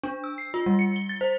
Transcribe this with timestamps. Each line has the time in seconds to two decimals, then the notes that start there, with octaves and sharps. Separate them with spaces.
0.04 D4
0.24 E6
0.38 C7
0.54 F4
0.66 G3
0.79 C#7
0.96 G7
1.09 A6
1.21 C5